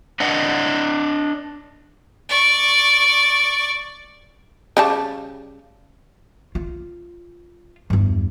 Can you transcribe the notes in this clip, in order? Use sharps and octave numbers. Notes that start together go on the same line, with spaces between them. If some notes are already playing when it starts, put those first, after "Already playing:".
D4 B4 D5 D#5 F#5
D5 C#6
C#3 G3 A5
F4
E2 G2